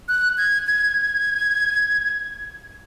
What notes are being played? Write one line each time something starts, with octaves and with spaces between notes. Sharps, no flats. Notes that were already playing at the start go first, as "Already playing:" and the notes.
F#6
G#6
G#6